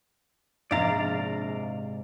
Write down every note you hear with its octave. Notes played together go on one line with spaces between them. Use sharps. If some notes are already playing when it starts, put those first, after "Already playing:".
A#1 G#2 C3 D5 F5 A#5 A6